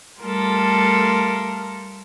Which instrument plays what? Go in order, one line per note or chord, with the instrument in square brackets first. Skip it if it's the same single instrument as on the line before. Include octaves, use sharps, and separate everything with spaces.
[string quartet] G3 A3 F4 A4 A#4